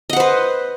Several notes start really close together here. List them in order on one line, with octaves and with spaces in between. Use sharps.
D#5 F#5 C5 B4